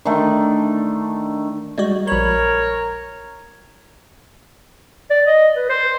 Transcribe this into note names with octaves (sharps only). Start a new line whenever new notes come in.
D3 D#3 A3
G3 G#3 F#4
A#1 A#4 C#5 B5
D5
D#5
B4
C5